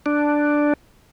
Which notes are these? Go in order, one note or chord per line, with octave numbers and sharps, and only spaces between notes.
D4